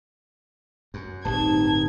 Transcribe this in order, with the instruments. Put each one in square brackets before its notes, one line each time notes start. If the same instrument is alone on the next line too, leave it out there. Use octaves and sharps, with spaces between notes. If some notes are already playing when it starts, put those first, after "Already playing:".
[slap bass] F#2
[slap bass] D1 G1 [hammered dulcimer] C3 D#4 C#6 [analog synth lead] A5 [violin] G#6